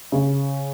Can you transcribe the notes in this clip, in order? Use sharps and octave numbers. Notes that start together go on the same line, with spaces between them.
C#3